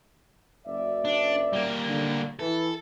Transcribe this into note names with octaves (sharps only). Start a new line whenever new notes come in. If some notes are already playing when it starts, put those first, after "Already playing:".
F#1 D5 E5
D4
G3 A#3
D3
E3 A4